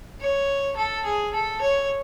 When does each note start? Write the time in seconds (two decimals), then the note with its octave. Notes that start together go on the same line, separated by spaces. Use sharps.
0.21 C#5
0.77 A4
1.05 G#4
1.33 A4
1.61 C#5